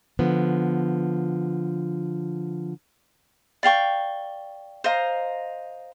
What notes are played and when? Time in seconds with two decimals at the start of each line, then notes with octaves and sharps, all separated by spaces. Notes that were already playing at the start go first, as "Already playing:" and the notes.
0.19 D3 F3 B3
3.63 D5 F5 G5 C#6
4.84 C5 D#5 F5 A#5